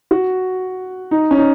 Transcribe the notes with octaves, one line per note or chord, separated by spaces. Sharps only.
F#4
D#4
C#4
D#4